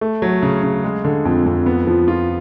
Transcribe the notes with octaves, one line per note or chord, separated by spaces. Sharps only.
A3
F#3
C#3
C#3
G#3
D3
F2
F2
B3
F3
F4